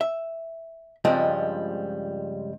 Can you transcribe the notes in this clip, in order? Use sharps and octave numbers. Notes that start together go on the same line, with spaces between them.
E5
C#2 G2 F3 G3 G#3 C4